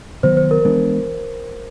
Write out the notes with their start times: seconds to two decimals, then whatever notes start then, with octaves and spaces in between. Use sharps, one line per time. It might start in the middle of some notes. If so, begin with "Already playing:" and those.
0.23 C3 D#3 F#3 B3 C5
0.37 C5
0.51 A#4
0.65 E3 G#3 B3 D4